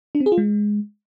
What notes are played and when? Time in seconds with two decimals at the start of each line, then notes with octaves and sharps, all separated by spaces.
0.15 D4
0.20 C4
0.26 G#4
0.32 F4
0.38 G#3